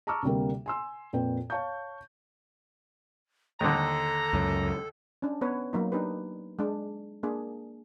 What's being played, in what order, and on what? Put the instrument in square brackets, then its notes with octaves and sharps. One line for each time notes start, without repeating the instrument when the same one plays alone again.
[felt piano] A5 A#5 C#6 D6 E6 F6
D2 C3 G3 A#3
G#5 C6 E6
F2 A#2 B4 G5
C#5 F5 A5 C#6 G6
[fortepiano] D#2 D3 [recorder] A4 [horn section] A#5
[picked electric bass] C#2 F#2
[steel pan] C#4 D4
B3 B4 C#5
F#3 A#3 D#4
D4 D#4 G4 B4
G#3 D4
A#3 D4 G#4